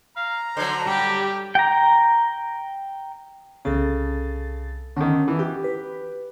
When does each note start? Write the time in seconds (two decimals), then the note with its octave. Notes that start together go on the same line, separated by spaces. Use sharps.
0.17 F5 A#5
0.57 D3 F#3 C5
0.86 G3 G4
1.55 G5 A#5
3.65 C2 C#3 A4 A6
4.96 D3 D#3 C#4
5.28 E3
5.39 F#4 G4
5.64 B4